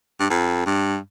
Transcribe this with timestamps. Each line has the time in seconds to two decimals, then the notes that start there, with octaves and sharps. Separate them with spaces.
0.20 G2
0.30 F2
0.66 G2